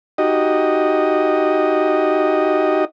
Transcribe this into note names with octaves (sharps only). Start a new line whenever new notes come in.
D#4 F#4 G4 D#5